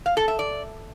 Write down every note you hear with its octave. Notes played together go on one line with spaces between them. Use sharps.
F5
A4
E5
D5